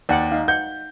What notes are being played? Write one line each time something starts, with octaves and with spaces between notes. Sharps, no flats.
D#2 D5 F#5
D#4 F5
F#5 G6